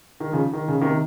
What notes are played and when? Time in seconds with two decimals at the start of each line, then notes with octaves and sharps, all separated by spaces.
0.20 D#3
0.32 C#3 F3
0.53 D#3
0.68 C#3
0.81 C3 D#3